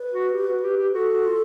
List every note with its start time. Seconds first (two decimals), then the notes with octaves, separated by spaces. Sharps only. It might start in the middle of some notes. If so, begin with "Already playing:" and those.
Already playing: B4
0.13 F#4
0.33 G4
0.47 F#4
0.63 G4
0.77 G4
0.93 F#4 A4
1.12 F#4
1.27 F4